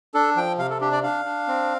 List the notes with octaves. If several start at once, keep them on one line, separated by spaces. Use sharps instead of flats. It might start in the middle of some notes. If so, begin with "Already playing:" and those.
D4 A4
F3 G5
C3 F5
A4
D4 G4
D5
D4 F5
D4
C4